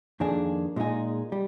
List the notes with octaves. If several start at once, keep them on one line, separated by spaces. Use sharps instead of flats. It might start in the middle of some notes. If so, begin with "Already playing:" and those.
F2 D#3 A#3 D4 G#4
A#2 G#3 D#4 G#4
G3